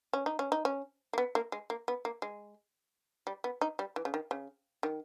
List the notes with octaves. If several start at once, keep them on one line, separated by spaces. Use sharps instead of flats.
C#4
D#4
C#4
D#4
C#4
A#3
B3
A#3
G#3
A#3
B3
A#3
G#3
G3
B3
D#4
G3
E3
C#3
D#3
C#3
D#3